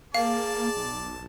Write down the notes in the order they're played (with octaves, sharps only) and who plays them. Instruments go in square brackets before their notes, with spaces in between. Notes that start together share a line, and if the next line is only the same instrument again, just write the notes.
[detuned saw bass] A#3 [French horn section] G#4 [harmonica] D5 A5 [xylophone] F5
[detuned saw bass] B1